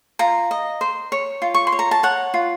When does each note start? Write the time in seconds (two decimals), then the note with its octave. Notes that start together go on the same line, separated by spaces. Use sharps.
0.19 F4 A#5
0.51 D#5
0.81 C5
1.12 C#5
1.42 F4
1.54 C#6
1.67 C6
1.72 C#5
1.79 A#5
1.91 A5
2.03 C#5 F#5
2.34 F4